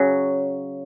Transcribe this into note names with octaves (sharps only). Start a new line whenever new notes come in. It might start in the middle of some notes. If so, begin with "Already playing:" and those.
Already playing: C#3 F#3